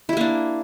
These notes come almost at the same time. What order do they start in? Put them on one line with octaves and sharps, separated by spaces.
E4 G4 A#3 D4